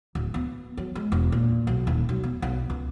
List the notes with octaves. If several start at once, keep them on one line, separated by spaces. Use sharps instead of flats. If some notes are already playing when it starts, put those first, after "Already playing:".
D1
B3
F#3
G#3
E1
A#2
B1
D#1
B1
B3
B1
C#2